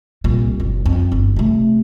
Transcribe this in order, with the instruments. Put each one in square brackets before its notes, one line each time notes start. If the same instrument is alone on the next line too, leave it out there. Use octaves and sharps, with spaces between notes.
[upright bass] C2 A#2
F#1
F2
G1
C3 A3